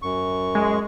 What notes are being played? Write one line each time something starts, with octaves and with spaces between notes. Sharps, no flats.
F#2 C#6
G#3